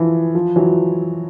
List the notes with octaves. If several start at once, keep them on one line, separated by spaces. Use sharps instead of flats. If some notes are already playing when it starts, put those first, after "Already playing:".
Already playing: E3 F3
F3
E3 F#3